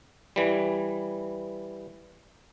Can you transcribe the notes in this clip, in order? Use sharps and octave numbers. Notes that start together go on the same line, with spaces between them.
E3 G3